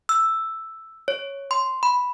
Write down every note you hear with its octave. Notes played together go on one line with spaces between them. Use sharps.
E6
C#5
C6
B5